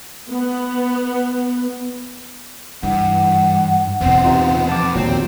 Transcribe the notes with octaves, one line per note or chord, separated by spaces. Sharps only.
B3
G2 E3 F#5
E2 B2 B3 C4
C3 D#4 F4
F2 A5 D6
D#2 A#2 D#3 F3 F#3 C4